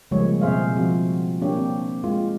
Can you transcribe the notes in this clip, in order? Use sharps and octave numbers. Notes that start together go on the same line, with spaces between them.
C#3 F3 G3 G#3 A#3 C#5
B2 C4 G#4 C5 E5 F5
F3 C4 F#4
A#3 D4 G4 C#5
C4
G#3 F4